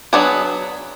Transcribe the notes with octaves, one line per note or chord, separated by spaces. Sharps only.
F#3 B3 D4 G#4